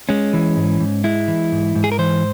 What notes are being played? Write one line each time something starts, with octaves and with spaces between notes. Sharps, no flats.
G#3 C#4
E3
G#2
G#2
G#3 E4
E3
G#2
G#2
G#4
A#4
E3 C5